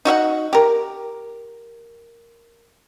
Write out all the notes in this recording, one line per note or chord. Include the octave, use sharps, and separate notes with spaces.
D#4 F#4 E5 F#5
G4 A#4